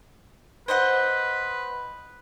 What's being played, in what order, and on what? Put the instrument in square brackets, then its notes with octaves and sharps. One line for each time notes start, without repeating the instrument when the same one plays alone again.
[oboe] B4 [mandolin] C5 D#5 F#5